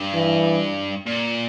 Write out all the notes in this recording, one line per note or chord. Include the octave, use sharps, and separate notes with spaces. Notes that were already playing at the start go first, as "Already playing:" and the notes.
Already playing: G2
E3
A#2